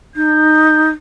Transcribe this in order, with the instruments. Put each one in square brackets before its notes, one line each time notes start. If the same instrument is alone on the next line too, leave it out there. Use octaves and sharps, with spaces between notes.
[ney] D#4 [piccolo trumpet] G6